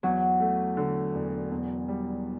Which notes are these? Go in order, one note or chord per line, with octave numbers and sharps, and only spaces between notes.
E2 F#3
A3
D3
E1
E2
G3